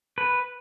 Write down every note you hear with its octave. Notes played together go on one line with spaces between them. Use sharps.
B4